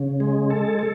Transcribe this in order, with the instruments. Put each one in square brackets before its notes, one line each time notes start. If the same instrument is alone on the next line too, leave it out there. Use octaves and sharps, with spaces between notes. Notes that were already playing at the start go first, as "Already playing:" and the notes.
Already playing: [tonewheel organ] C#3
G#3
A4
A4